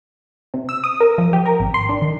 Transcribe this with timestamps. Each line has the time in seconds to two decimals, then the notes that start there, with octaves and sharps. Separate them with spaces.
0.54 C3
0.69 E6
0.84 D#6
1.00 A#4
1.18 F3
1.33 G4
1.45 A#4
1.60 G#1
1.74 C6
1.89 D4
2.02 D#3